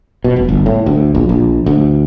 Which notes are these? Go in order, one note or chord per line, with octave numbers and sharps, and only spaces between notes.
B2
F1
G1
A2
D2
A#1
A#1
D2